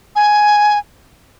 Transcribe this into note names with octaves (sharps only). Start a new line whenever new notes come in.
G#5